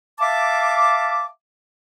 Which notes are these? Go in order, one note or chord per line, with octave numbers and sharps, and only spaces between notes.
E5 F5 A5 D6